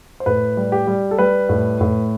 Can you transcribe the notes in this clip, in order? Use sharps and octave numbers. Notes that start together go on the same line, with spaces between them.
C5
A2 B4
G3
G4
G3
A4
G3 B4
A2
A2